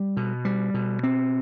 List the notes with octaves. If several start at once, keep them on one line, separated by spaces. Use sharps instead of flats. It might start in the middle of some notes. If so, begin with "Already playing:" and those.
Already playing: G3
B2
G3
B2
C4